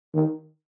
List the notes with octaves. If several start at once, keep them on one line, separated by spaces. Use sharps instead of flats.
D#3